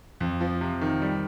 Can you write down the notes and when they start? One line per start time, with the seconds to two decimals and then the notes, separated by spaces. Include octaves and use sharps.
0.20 F2
0.40 F3
0.61 C3
0.81 D#3
1.02 G3